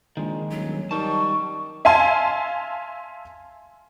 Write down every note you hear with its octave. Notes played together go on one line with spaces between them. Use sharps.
A#1 D#3 G#3
D#1 F#3
D#3 G3 A5 C#6
E5 F5 G#5 A5 C6